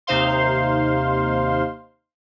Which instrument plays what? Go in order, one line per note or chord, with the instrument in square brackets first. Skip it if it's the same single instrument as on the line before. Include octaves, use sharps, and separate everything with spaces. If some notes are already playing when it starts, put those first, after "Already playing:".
[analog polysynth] D#2 C3 D#4 C5 F5 C6